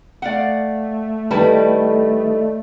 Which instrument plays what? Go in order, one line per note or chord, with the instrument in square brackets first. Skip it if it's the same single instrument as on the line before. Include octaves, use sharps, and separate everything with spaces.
[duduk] A3 [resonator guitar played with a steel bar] D5 F5 F#5
[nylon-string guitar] D#3 B4 [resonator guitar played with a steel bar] G3 E4 A5 [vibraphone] A4 D5 D#5